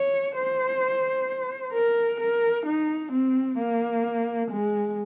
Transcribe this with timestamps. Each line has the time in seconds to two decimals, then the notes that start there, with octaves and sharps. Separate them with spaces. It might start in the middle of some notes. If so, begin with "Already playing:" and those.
Already playing: C#5
0.35 C5
1.73 A#4
2.20 A#4
2.66 D#4
3.12 C4
3.58 A#3
4.51 G#3